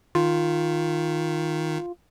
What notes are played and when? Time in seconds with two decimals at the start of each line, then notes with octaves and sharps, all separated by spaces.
0.15 D#3 F4